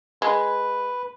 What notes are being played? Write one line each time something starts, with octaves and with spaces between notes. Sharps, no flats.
G#3 B4